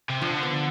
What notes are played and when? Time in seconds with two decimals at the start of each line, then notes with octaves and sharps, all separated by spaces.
0.10 C3
0.22 D3 F3
0.43 B3